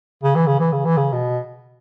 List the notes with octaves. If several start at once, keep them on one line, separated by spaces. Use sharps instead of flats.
C#3
E3
C#3
E3
C#3
E3
C#3
B2